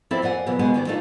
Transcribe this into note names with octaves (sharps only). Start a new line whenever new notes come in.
F3 C4 E4 A4 D5 E5
F2 A#3 D5 F#5 G#5
B2 E3 F#3 B3
D#2 B2 G#3 B3 F#5 G#5
D2 D#3 D5
A#2 A3 D4 D#4 F4 A4